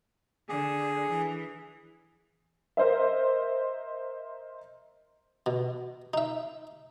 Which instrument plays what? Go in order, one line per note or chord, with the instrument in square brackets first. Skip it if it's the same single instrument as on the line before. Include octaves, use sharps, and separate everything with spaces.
[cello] D3 [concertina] G#4
[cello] E3
[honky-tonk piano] A#4 C5 D#5 E5
[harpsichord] B2
D#4 E5